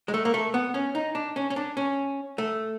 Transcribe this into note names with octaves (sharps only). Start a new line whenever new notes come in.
G#3
A3
A#3
A3
B3
C#4
D#4
D4
C#4
C#4
D4
C#4
A3